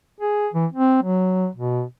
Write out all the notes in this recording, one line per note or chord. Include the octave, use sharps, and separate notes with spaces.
G#4
E3
C4
F#3
B2